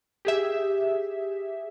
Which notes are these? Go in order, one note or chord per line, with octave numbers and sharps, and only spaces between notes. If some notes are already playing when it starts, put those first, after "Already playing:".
G4 G#4 E5